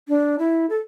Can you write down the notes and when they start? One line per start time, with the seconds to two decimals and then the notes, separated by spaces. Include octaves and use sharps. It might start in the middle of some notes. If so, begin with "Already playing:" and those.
0.09 D4
0.39 E4
0.70 A4